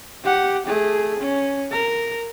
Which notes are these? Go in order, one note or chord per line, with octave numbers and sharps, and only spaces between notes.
G4 F#5
A3 G#4
C#4
A#4